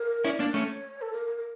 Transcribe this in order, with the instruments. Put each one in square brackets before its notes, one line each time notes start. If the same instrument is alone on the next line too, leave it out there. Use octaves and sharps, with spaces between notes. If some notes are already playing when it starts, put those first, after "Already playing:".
Already playing: [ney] A#4
[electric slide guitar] C#4 E4 [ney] D5
[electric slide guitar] A#3 D4 [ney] C#5
[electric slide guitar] A3 C#4
[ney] A4
A#4
A#4
A#4